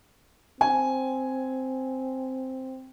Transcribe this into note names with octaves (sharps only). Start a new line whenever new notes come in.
C4 G#5